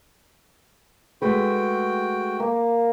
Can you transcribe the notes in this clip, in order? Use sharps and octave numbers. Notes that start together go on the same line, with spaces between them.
G#3 A3 F#4 B4 G5
A#3